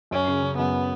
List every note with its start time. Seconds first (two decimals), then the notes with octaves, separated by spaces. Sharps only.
0.11 F#2 C#4
0.28 C#3
0.43 C#3
0.58 F#2 B3